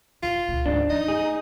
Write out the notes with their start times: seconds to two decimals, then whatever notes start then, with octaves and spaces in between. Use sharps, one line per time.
0.23 F1 B2 F4
0.49 C#2 A#2
0.66 D2 G#2 E3 D4
0.90 E3 D#4 D#5
1.08 A3 G#4